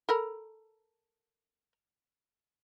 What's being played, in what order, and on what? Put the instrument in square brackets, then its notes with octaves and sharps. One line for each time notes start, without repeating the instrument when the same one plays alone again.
[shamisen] A4 A#4 B5